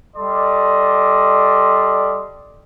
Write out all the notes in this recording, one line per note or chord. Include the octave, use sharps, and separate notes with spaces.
G3 A4 D5 D#5 C6